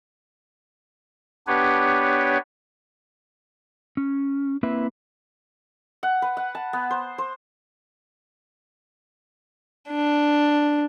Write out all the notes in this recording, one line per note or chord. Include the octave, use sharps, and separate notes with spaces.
B3 D4 G4 B4 C#5
C#4
A#3 C4 E4 B4 E5
F#5
B4
F#5
A5
B3
C5
C5
D4